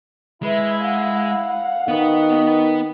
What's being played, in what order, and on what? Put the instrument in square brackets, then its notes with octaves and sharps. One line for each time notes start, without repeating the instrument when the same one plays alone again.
[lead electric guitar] G#3 [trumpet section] E4 [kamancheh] B4 E5
[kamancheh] F5 F#5
[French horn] D#3 [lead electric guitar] B3 B4 [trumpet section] F#4 D#5